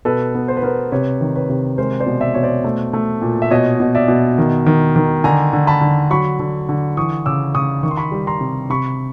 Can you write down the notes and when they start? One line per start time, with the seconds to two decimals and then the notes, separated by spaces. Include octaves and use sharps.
0.05 B2 A4 B4
0.35 B3
0.48 C5
0.57 B4
0.62 B3 A#4 C5
0.92 C3 B4 C#5
1.21 D#3
1.35 B4 C#5
1.50 C3
1.78 G#3 A#4 C5
2.00 C5 D5
2.06 B2
2.21 D5 E5
2.34 B2 C#5
2.43 C5 D5
2.64 A3
2.93 A3
3.22 A#2
3.42 E5
3.51 B2 C#5 D#5
3.80 B2
3.95 D5 E5
4.08 B2
4.38 D#3
4.66 D#3
4.96 D#3
5.24 D3 G#5 A#5
5.53 D3
5.67 A5 B5
5.81 D3
6.11 F#3 B5 C#6
6.39 D3
6.69 D3
6.97 E3 C#6 D#6
7.26 C#3 D6 E6
7.54 C#3 C#6 D#6
7.83 D#3 C#6
7.91 C6
7.97 B5 C#6
8.12 G3
8.27 A#5 C6
8.41 C3
8.70 C3 B5 C#6